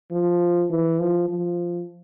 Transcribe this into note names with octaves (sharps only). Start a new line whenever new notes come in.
F3
E3
F3
F3